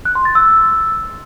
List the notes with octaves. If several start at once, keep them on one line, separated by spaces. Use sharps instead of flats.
F#6
C6
A6
E6